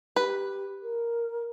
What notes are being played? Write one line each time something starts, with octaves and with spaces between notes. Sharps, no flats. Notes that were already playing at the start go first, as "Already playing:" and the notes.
G4 B4
A#4